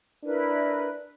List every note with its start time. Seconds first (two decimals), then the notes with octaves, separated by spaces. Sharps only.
0.23 D4 E4 A#4 B4